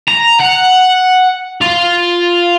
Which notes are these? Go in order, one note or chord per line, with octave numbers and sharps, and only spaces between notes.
A#5
F#5
F4